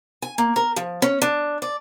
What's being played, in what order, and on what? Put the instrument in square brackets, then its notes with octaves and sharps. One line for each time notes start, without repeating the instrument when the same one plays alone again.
[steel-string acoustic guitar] G#5
A#3
A#4
F3
C#4
D4
D5